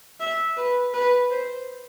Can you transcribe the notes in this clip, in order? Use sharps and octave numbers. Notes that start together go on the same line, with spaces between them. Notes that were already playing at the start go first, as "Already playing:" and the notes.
E5
B4
B4
C5